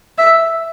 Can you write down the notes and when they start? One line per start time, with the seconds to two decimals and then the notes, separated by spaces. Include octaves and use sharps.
0.18 E5